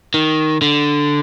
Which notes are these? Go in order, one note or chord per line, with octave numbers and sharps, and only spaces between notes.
D#3
D3